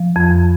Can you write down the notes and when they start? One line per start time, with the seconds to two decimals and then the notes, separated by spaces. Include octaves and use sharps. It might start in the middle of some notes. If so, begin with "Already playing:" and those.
Already playing: F3
0.16 F2